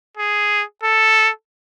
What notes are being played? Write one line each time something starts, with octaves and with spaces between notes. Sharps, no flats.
G#4
A4